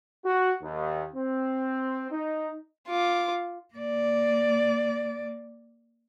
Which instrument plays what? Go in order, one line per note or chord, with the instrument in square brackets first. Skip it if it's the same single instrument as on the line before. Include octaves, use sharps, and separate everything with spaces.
[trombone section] F#4
D#2
C4
D#4
[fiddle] F4 D6
[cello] A#3 D5